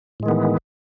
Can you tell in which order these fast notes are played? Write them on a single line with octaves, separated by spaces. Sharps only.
A2 G#3 D#3 B3 E3